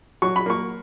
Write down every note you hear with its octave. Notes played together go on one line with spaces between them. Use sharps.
F#3 C#6
B5
A#3 C#6